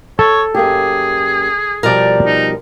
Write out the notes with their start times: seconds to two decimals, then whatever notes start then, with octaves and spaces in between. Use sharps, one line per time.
0.19 A4 C#5
0.55 F#2 A#3 G4 G#4
1.83 B2 F3 G3 A#4 D5
2.25 D#4